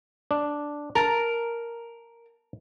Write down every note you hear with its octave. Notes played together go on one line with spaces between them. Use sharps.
D4
A#4 A5 A#5